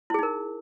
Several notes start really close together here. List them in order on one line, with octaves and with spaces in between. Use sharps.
E4 G#4 D#4 A#4